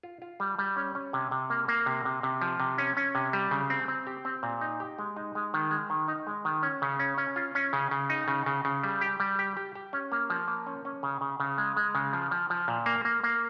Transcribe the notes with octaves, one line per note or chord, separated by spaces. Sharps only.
F4
F4
G3
G3
C#4
C#4
C3
C3
A#3
A#3
C3
C3
C3
F3
C3
C#4
C#4
C3
G3
C#3
C4
C4
G4
C4
A#2
D#4
G4
G#3
D#4
G#3
D#3
G#3
D#3
D#4
G#3
D#3
C#4
C#3
C#4
C#4
F4
C#4
C#3
C#3
D#4
C#3
C#3
C#3
G3
G4
G3
G4
G4
G4
C#4
A#3
F3
A#3
C#4
C#4
C#3
C#3
C#3
G#3
G#3
C#3
F3
F3
F3
A#2
A#3
A#3
A#3